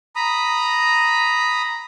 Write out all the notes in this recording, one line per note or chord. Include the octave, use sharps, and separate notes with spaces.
A#5 B5 D#6